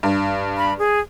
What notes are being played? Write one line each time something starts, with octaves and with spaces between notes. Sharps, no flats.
G2
B5
G#4